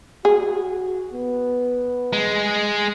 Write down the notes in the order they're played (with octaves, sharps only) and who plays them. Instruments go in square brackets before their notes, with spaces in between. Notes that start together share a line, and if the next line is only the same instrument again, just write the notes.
[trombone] F#4 [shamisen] G#4
[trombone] B3
[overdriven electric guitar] G#3